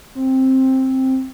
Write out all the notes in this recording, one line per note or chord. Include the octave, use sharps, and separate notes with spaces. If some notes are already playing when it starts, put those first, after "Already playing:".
C4